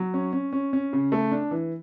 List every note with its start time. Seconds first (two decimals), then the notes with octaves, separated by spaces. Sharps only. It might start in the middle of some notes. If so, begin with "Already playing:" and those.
Already playing: F#3
0.14 C#4
0.33 C#4
0.53 C#4
0.73 C#4
0.93 C#3
1.12 A3
1.32 D4
1.51 E3